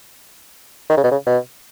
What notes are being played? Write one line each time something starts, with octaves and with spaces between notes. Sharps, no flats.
D#3
C#3
B2
C#3
B2